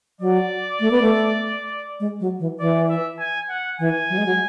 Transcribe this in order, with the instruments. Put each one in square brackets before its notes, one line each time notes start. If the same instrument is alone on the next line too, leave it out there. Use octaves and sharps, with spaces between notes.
[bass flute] F#3 [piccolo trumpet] D5
[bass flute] A3
B3
A3
G#3
F#3
E3
[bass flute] E3 [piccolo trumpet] D5
[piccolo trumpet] E5
G#5
F#5
[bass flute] E3 [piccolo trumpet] G#5
[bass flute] F#3
G#3
F#3